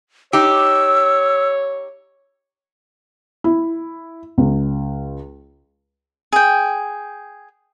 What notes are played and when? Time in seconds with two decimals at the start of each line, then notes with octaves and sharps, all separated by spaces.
0.33 D#4 G4 C#5 E6
3.44 E4
4.38 C#2
6.33 G#4 G5